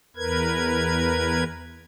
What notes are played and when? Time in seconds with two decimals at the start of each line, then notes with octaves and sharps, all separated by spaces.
0.16 E2 A#4 B4 G#6